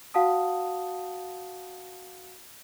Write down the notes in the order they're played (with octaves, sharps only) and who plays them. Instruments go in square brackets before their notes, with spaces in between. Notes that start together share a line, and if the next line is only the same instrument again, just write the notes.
[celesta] F#4 F5 F#5 A5 D#6